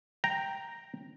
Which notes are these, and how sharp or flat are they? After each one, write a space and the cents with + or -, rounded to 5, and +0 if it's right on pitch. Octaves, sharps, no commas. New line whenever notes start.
G5 +0 A#5 +0